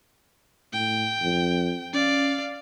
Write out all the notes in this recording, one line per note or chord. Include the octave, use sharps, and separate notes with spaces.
A2 G5
F2
C#4 D5 F5